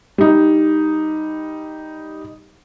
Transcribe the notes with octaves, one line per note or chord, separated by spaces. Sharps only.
G3 D#4